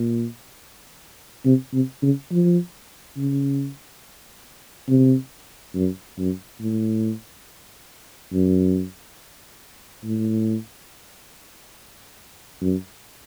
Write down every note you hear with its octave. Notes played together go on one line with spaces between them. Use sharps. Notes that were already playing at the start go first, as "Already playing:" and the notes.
Already playing: A#2
C3
C3
C#3
F3
C#3
C3
F#2
F#2
A2
F#2
A2
F#2